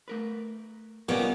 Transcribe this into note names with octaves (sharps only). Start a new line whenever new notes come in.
A3 A#4 B4
A#2 G3 A#3 B3 C#4 D#4 B4 C#5